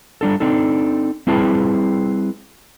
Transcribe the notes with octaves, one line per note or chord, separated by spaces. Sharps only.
G3 D4 A4
C4 D4 D#4 A4
G3 C4 E4 G#4 B4 A5